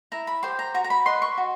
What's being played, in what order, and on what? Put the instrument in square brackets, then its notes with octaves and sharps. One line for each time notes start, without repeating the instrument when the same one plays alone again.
[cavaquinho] E4 A#5
B5
G4 C5 C6
A#5
F#4 A#5
A#5
B5
B4 D#5 C6
C#6
F#4